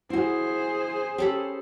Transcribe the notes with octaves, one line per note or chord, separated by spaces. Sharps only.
E4 F#4 G#4 C5
C#4 G4 A4 B5